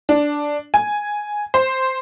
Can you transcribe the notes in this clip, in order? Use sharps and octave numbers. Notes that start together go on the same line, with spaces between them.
D4
G#5
C5